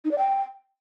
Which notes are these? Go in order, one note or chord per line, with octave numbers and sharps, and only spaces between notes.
D#4
D5
G5